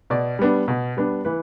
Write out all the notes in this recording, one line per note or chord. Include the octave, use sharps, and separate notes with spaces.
B2 D5
G3 B3 D4
B2
G3 B3 D4
E3 B4